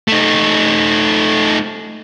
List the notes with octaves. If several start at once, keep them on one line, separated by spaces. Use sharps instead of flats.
A3 D#4